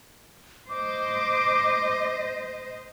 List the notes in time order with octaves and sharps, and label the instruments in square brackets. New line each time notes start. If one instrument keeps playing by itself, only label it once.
[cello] C5 D#5 [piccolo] D6